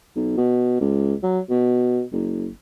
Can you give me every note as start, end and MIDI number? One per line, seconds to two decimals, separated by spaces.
0.15 0.34 35
0.37 0.80 47
0.81 1.14 37
1.23 1.39 54
1.50 2.03 47
2.12 2.49 30